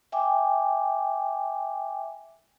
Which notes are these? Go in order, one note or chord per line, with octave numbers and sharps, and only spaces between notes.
E5 G5 G#5 D6